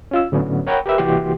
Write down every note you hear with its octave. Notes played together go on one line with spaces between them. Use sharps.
C#4 F4 E6
A2 D3 F#3 B3 C#4
A#4 C#5 F#5 G5 A#5 B5
G4 A#4 B4 E5
C2 E3 A#3 F#4 G4 C6